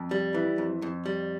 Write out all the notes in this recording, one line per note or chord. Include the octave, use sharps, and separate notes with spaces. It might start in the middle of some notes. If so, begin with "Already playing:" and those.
Already playing: F2
G3
E3
F2
F2
G3